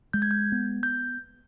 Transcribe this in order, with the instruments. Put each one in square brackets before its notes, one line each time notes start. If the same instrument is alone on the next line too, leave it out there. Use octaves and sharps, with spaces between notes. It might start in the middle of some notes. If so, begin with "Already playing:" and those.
[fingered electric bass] G#3 [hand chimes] G6
[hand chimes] G#6
G6
[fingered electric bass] B3
[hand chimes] G6